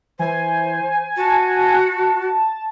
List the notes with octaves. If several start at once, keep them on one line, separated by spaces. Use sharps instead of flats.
E3 C5 G#5
F#4 A5